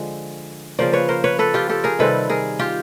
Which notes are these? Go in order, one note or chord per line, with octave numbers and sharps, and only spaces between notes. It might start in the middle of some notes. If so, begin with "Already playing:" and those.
Already playing: D3 F3 G#3
C#3 F3 A#3 C5 D5
B4 C#5
A#4 C5
B4 C#5
A4 B4
F4 G4
G4 A4
G#4 A#4
C3 D#3 G3 C4 A4 B4
G#4 A#4
F4 G4